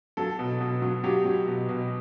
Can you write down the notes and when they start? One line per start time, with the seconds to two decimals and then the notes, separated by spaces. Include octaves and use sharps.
0.17 F#3 A4
0.39 B2
0.61 B2
0.82 F#3
1.04 F#3 G4
1.25 F#3
1.47 B2
1.69 B2